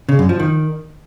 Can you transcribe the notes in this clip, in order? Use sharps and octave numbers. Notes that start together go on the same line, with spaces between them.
C#3
F#2
F3
D#3